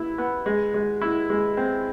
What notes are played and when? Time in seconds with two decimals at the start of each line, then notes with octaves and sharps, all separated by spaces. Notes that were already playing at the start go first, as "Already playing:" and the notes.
Already playing: B3 E4
0.18 B3
0.46 G#3
0.74 G#3
1.02 E4
1.30 G#3
1.57 C4